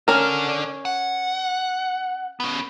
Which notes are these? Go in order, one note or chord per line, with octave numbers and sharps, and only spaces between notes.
D3 C#4 D4 A#4
F#5
B3 C#4